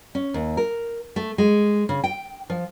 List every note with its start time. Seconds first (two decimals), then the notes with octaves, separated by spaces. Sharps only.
0.15 C#4
0.34 D#2
0.57 A#4
1.16 A3
1.38 G#3
1.89 C#3
2.04 G5
2.50 F3